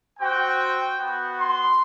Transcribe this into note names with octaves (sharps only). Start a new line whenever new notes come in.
C4 F#4 G5
B3 F#4
C6